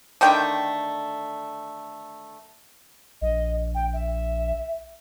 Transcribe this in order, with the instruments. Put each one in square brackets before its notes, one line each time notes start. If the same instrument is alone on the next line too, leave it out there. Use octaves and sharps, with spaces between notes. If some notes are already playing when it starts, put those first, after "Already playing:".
[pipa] D3 D#3 A3 G5
[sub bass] A#1 [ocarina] D#5
[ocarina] G5
E5